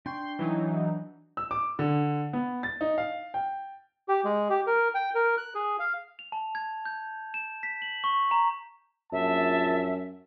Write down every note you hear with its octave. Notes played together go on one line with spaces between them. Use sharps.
D4 G5 C6 C#6
E3 F#3 D#4
E6
D6
D3
B3
A6
D#4
F5
G5
G4
G#3
G4
A#4
G5
A#4
F#6
G#4
F5
F7
A5
G#6
G6
E7
B6
F#7
C#6
A#5
A#1 F#2 E5 A5